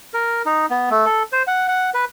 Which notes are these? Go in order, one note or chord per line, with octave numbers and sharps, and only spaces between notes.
A#4
D#4
B3
A3
A4
C5
F#5
F#5
B4